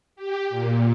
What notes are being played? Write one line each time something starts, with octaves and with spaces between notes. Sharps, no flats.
G4
A#2